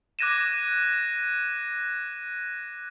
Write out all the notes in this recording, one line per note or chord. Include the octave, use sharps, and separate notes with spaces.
D6 F#6 G#6 A#6 D#7 E7